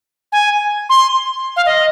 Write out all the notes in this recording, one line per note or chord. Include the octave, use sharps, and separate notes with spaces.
G#5
C6
F5
D#5